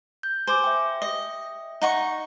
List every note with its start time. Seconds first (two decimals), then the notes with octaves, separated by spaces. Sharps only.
0.23 G6
0.47 C5 G#5 D6
0.64 E5 G5
1.02 D#5
1.82 D#4 F#5 C#6